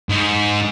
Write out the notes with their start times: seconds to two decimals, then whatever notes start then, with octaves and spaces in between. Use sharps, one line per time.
0.09 G#2